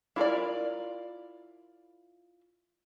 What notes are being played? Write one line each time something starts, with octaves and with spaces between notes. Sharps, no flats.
E4 F4 A#4 D5